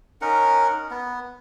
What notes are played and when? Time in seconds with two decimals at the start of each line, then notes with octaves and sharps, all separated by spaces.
0.21 C#4 D#4 A#4 F#5
0.91 B3